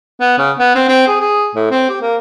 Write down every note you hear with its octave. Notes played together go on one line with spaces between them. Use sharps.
B3
C#3
B3
C4
C4
G#4
G#4
A2
C4
G4
A#3